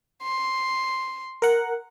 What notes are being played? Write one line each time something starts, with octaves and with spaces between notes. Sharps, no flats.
C6
A#4 F#5